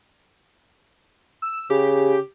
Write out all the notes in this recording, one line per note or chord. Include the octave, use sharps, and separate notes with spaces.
E6
C#3 G4